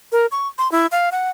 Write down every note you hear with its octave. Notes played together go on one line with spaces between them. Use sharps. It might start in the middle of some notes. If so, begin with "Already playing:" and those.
A#4
C#6
C6
E4
F5
F#5